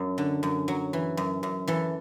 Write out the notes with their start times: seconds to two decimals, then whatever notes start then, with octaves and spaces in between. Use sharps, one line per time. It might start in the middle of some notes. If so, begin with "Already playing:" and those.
Already playing: F#2 F#3
0.18 D3
0.43 F#2
0.68 F#3
0.93 E3
1.17 F#2
1.43 F#2
1.68 E3 A4